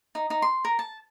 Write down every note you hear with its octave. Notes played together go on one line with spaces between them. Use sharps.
D#4
D#4
C6
A#4
A5